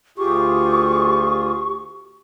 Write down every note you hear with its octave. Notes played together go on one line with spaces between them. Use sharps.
D2 F4 G4 G#4 C#6